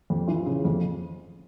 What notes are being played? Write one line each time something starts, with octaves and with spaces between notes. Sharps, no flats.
F2
E3 F4
C#3
F2